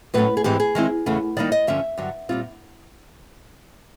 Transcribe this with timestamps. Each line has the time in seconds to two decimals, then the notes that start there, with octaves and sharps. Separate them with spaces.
0.14 A2 F#3 A3 C#4 B4
0.37 G#4
0.44 G#2 E3 G#3 C4 G4
0.60 G#4
0.75 D#3 G#3 C4 E4
1.06 E2 C#3 E3 A3 C#4
1.37 D#3 G3 A#3 D#4 D5
1.52 D#5
1.67 G2 D3 F3 C#4 E5
1.98 G2 D3 F#3
2.29 A#2 G3 C4 F4